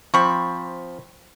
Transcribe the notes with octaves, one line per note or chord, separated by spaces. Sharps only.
F3 C4 B5 C#6